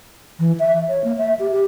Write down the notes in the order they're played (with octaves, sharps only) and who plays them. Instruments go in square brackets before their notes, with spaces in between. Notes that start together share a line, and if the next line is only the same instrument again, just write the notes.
[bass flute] E3
E5
C#5
A#3
E5
G4
G4